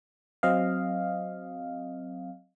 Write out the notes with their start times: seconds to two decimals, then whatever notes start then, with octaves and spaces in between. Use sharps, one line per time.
0.43 F#3 C4 D#5 F5